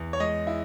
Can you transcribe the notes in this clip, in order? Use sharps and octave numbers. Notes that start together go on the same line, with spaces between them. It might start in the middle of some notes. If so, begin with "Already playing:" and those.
Already playing: E2
C#5
G#3 D#5
E4